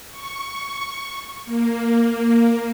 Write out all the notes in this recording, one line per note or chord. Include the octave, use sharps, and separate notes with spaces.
C#6
A#3